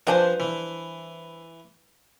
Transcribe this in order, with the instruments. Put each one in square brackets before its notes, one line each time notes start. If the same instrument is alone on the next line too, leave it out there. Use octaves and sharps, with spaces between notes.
[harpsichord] F3 [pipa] G3 D4 C5 [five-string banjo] B4 G#5
[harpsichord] E3